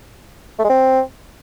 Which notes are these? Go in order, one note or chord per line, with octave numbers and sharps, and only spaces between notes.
A3
G#3
C4